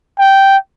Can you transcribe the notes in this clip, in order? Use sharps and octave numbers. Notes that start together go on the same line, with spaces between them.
G5